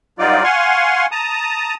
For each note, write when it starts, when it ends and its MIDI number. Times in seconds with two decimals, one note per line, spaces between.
0.19 0.43 43
0.19 0.43 54
0.19 0.43 63
0.19 0.43 65
0.19 0.43 74
0.44 1.06 77
0.44 1.06 78
0.44 1.06 80
0.44 1.06 84
0.44 1.06 85
1.12 1.74 81
1.12 1.74 82
1.12 1.74 87